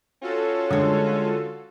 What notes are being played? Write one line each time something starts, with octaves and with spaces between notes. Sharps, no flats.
C#4 F4 F#4 A4
D3 G#3 C#5